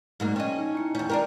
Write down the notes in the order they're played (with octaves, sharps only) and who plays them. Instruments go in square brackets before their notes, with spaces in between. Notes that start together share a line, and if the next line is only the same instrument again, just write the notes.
[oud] G#2 F#3 A#3
[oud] C#4 D#5 [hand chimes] G5
[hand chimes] D#4
E4 C#7
[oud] E2 C#4 [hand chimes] G5 G6
[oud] D4 G4 A#4 [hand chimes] D5 G5